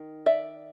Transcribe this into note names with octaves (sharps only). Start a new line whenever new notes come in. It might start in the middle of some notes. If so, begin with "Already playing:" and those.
Already playing: D#3
D5 E5